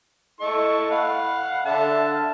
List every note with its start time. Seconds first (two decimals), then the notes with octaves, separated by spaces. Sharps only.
0.41 E4 A4 D#5 C#6
0.90 F5 F#5 B5
1.65 D3 E5 A5
2.15 F6